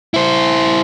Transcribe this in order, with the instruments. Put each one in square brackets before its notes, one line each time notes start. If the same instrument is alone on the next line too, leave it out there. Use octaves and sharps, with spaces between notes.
[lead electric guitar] E4 C5